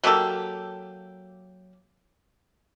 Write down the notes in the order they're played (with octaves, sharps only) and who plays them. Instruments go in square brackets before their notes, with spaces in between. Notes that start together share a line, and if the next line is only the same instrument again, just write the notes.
[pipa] F#3 A#3 G4 A4